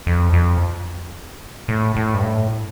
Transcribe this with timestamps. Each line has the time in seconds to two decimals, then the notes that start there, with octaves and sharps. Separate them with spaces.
0.07 F2
0.33 F2
1.68 A2
1.96 A2
2.14 G2
2.23 A2